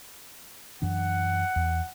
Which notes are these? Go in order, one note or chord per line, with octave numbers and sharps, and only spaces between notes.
F#2 E3 D4 F#5
E2